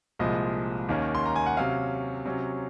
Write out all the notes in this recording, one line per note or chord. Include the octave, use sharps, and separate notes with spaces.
C2 A#2 F3 G#3 D#5
D#2 D#3 A#3 C#4
C6
A#5
G#5
F#5
C3 F#3 C#4 F5
C3 F#3 C#4